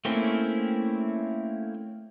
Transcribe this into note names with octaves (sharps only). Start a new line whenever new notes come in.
A3 A#3 C4 C#4 E4